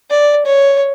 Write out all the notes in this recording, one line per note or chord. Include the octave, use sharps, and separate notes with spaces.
D5
C#5